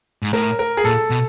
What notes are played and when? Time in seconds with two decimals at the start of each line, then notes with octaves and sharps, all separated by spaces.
0.22 G#2
0.33 A2 A#4
0.59 A#4
0.77 G#4
0.85 A#2 A4
1.10 B2